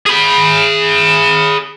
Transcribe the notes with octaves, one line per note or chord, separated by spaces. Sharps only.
G#4 B5